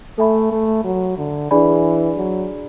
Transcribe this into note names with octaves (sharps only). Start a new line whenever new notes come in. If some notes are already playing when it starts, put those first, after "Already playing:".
A3 A4 E5 G#5 B5
A3
F#3
D3
E3 D4 G#4 D5 G#5 B5
F#3